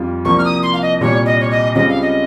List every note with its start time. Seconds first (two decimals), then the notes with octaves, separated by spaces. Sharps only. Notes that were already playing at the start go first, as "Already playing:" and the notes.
Already playing: F2 G3 F4
0.25 C2 C3 F3 A#3 C#6
0.38 F6
0.45 D#6
0.63 C6
0.73 F5
0.82 D#5
1.01 C2 A#2 G3 C#5
1.26 D#5
1.40 C#5
1.51 D#5
1.75 C#2 C#3 G3 C4 F4 D#5
1.89 F5
2.02 D#5